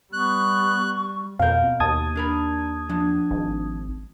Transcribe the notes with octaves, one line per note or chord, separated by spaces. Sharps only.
G3 B3 C#6 F#6
F2 B2 A#4 F5 G6
D#2 A5 D#6 G#6
D4 A#4 B5
F3 D4
G#1